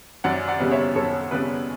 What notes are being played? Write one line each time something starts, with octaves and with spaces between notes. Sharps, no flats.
F#2 D5 F#5
D5 F#5
C#3 G3 B3
C#5 E5
F#2 A4 C#5
C#3 G3 B3 B4 D5